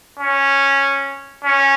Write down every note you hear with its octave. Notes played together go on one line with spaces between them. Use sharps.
C#4
C#4